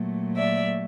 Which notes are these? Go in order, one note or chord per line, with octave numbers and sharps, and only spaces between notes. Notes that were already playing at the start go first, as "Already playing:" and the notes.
Already playing: A#2 F#3 A3
D5 E5